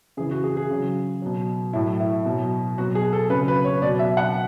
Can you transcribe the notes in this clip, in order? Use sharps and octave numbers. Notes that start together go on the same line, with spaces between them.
C#3 E3 G#4
F#4
G#4
G#4
C#3 F#3
B2 F#3
A2 F#3 E4
E4
B2
F#3
B2 F#3 F#4
G#4
A4
C#3 F#3 B4
B4
C#5
B2 F#3 D5
E5
F#5